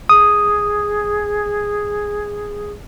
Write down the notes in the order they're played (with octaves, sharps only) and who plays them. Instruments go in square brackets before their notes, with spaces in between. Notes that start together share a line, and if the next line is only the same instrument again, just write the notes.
[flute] G#4 [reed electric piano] D#6